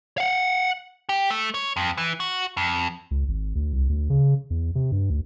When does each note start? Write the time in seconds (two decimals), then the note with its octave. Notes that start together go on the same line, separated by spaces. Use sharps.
0.18 F5 F#5
1.09 G4
1.31 A3
1.54 C#5
1.76 F2
1.98 E3
2.20 F#4
2.57 F2
3.11 C#2
3.28 G#1
3.55 D2
3.73 C2
3.89 D2
4.10 C#3
4.50 E2
4.75 C3
4.92 G2
5.10 D2